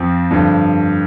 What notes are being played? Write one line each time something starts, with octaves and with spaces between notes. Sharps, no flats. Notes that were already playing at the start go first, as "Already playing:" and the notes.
Already playing: F2 F3 C4
G2 D3 F3